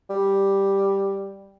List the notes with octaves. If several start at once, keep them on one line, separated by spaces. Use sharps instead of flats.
G3